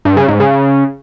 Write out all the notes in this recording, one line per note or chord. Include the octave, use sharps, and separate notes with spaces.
G2
C#3
G#2
C#3